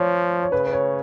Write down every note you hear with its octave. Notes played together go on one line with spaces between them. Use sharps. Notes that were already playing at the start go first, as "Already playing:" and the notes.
Already playing: F3 C#5 D5
C#5
C#3 B4
B4
C#5